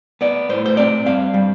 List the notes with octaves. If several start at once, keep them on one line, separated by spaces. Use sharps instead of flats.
B3 D5
A2 C5
C5
C4 D5
G2 F5
G3